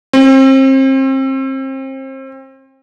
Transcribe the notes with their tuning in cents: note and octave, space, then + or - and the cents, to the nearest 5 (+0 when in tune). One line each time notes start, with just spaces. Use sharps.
C4 +35